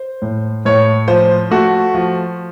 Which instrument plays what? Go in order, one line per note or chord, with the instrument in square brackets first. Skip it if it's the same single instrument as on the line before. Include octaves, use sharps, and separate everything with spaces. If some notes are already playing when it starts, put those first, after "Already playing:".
Already playing: [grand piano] C5
A2
A2 C#5
F3 C5
A3 F#4
F3